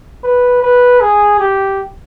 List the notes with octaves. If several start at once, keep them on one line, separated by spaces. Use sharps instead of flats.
B4
B4
G#4
G4